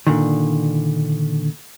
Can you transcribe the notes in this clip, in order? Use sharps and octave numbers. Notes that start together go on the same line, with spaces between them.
A#2 D3 D#3